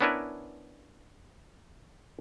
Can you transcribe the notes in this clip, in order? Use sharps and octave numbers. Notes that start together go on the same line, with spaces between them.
B3 C#4 D4 E4 A#4 B4